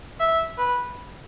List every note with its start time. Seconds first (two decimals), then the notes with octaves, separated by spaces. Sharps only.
0.20 E5
0.58 B4